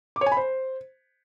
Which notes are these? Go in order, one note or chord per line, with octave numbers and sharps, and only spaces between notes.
D6
C#5
G#5
B5
C5